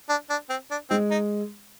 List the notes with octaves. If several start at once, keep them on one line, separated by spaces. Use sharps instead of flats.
D4
D4
C4
D4
G#3 C4
D#4